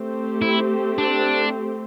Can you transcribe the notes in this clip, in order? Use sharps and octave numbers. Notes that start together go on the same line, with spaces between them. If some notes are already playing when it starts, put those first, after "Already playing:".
Already playing: A3 C4 G4
E4
D4